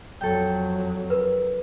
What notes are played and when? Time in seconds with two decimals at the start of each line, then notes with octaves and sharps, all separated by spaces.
0.21 F2 F#3 A4 G5
1.10 A#4 B4